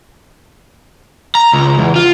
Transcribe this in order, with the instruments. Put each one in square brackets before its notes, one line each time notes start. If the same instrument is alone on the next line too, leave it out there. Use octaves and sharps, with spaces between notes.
[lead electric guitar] A#5
C#2
E2
F4